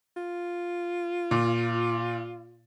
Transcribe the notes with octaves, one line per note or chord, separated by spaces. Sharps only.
F4
A#2